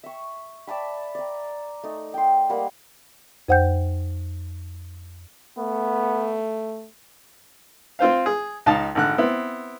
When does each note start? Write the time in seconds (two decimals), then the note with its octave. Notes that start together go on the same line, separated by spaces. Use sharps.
0.03 E5 C#6
0.67 D5 E5 A5 B5
1.15 D5 A#5
1.83 A3 D#4
2.14 G5 C6
2.49 G3 A#3 A#4 F#5
3.48 F2 C5 F#5 G5 G6
5.58 A3 B3
7.99 C4 F4 C5 F5
8.26 G#4
8.66 C#2 D#4 F5 A5
8.95 G#1 D3 F#6
9.18 B3 C4 E4